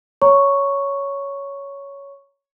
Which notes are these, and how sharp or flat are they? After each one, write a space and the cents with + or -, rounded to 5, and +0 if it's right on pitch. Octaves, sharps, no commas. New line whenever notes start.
C#5 +10 A#5 +0 C#6 +0